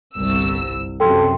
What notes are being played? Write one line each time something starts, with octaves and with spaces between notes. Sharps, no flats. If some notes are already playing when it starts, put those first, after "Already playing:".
G1 C2 E6
F#2 C3 F#3 A4 G5 C6